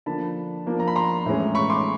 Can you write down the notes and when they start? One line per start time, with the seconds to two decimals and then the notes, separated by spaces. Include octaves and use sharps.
0.06 D3 F3 A#3 D4 A5 B5
0.66 F3 A#3 D4
0.80 A#5
0.88 B5
0.96 A#5 C6
1.26 A2 E3 G#3 C#4
1.55 B5 C#6
1.70 C6 D6